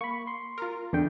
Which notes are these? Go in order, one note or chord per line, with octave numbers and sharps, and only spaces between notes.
A#3 B5 C#6
C6
F4 A#4
E2 D3 E3 G5